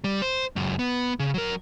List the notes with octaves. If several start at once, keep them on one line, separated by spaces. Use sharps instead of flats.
G3
C5
C#2 F#2
B3
C#3
F#3 A#4